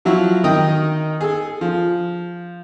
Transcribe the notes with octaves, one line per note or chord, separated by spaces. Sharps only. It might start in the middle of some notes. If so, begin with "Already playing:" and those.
F3 F#3 E4 F#4
D#3 D#4 D#5 G5 D#6
G#4 A4
F3